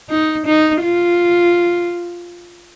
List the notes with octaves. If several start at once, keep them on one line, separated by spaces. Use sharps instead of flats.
D#4
D#4
F4